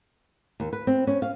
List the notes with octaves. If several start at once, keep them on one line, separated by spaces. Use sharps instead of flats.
D#2
B4
C4
C#4
F5